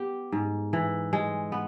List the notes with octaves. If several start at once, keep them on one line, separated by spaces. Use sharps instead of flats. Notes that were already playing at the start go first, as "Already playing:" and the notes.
Already playing: B3 G4
G#2
E3
G#3
B3